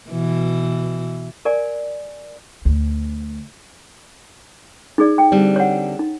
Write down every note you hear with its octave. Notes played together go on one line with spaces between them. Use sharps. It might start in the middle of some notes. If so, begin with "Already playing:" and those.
B2 E3
A#4 D5 G#5
D2
D#4 G#4 D5
G5
D3 G3 C4
C#5 F#5
D#4